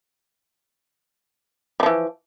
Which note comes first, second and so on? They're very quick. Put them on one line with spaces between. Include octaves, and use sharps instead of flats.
G3 F3 E3